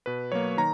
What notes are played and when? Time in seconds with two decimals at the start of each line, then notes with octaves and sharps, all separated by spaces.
0.06 B2 B4
0.32 F#3 A#3 C#5
0.57 D#3 A#5